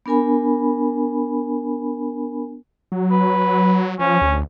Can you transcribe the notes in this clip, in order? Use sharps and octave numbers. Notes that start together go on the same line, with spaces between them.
B3 D4 A#4 G#5 B5
F#3
B4
F3 C#4
D2